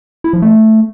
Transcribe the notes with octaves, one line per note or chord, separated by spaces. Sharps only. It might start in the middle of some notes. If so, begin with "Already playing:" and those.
E4
F3
A3